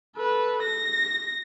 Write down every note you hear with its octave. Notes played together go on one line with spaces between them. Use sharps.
A4 B4
A#6